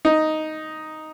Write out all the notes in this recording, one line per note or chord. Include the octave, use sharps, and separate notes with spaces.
D#4